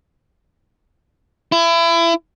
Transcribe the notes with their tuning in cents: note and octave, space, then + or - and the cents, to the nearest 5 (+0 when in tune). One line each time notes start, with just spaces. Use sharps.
E4 +30